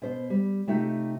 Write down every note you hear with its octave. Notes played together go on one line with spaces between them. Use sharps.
B2 C5
G3
C3 A3 D#4 F4 G4